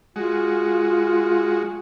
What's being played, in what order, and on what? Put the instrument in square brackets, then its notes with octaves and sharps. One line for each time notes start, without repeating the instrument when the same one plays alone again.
[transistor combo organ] G#3 F#4 [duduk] F4